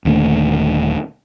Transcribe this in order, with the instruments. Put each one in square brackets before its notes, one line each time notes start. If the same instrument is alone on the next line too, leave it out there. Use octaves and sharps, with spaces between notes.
[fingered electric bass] D#1 D#2 D3 A3